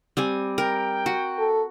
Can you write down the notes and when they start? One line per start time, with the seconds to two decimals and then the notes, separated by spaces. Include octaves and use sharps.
0.17 G3 C4 G#5
0.58 A#4 G5
1.06 F#4
1.39 A4